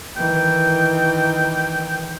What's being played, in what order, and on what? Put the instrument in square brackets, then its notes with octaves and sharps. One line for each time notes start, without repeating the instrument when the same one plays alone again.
[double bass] D#3 E3 [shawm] G5